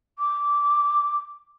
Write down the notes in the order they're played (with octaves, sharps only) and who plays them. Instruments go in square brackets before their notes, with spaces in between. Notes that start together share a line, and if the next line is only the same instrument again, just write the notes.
[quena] D6